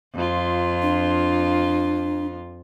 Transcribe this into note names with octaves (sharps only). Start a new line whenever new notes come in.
F2 F4
D4